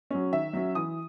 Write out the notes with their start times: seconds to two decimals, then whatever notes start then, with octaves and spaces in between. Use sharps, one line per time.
0.11 F#3 C#4
0.32 D#3 E5
0.53 F#3 C#4
0.75 E3 D#6